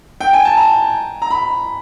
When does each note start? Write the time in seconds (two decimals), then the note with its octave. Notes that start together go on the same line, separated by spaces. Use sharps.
0.21 G5
0.33 G#5
0.45 A5
0.57 A#5
1.22 A#5
1.30 B5